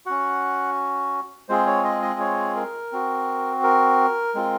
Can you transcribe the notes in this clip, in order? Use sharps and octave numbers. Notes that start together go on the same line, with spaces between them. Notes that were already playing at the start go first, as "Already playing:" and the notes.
C#4 F#4 F#5
G#3 C4 F4 G#4 C5
C#5
D#5
D#5
C#5
A#4
C4 F#4
A#4
G#3 C4 F4